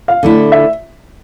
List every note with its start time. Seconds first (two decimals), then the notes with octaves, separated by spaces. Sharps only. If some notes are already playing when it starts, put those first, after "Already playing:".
0.08 F5
0.23 D3 A3 E4
0.52 E5